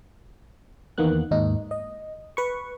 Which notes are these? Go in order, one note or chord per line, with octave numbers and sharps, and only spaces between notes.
E2 D#3 A#3 B3 F#6
D#2 G#2 D#4
D#5
B4 C#6